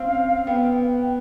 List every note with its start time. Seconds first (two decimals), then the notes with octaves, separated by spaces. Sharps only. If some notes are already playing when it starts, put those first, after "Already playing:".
Already playing: C4 C#4 F5
0.47 B3 G5